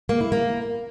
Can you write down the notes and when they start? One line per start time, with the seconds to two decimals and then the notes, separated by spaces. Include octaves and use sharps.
0.09 A#3
0.21 E4
0.32 A#3